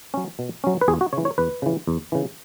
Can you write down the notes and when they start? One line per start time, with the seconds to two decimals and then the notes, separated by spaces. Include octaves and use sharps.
0.14 F#3 C#4
0.39 B2
0.64 F#3 C#4
0.81 B4
0.88 E2 G#4
1.01 F#4
1.13 C#3 E3 C#5
1.25 C#5
1.38 E2 B4
1.62 C#3 E3
1.87 E2
2.12 C#3 E3